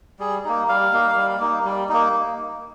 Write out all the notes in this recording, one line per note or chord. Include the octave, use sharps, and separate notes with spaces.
G3 G#4
A#3 D#4
G3 F5
A#3 D#4
G3
A#3 D#4
G3
A#3 D#4